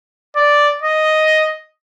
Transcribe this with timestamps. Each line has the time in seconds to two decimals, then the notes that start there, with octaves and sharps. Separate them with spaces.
0.36 D5
0.82 D#5